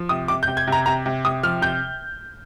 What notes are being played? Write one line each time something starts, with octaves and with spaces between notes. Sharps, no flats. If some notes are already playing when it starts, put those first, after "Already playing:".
Already playing: F3
C3 D#6
C3 D6
G6
C3
G#6
C3
A#5
C3 A#5
C3
C3 D#6
F3 F6
C3 G6